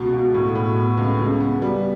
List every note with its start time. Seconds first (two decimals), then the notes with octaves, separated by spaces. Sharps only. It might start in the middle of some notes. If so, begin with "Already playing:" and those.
Already playing: C#2 B2
0.13 B2
0.34 A2
0.55 A2
0.76 B3
0.97 C#2
1.19 C#3
1.40 B3
1.62 G3